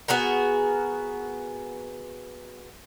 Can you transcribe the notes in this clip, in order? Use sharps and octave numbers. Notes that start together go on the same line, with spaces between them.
B3 F#4 G#4 A#4